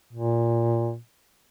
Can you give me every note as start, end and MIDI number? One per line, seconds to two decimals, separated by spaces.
0.13 0.97 46